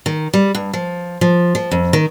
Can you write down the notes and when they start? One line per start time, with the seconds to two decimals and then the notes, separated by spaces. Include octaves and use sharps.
0.06 D#3
0.34 G3
0.55 G2
0.73 F3
1.21 F3
1.55 F3
1.71 F2
1.93 D#3